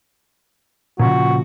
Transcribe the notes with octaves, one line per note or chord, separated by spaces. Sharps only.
A#2 C#3 F3 F#4